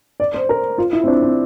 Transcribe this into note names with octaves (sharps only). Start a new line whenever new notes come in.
D5
C5
A#4
F4
E4
C4
D4
C4